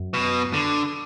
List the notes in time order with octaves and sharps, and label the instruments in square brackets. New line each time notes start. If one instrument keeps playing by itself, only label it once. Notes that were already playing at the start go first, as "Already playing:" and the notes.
Already playing: [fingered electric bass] F#2
[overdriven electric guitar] B2
D3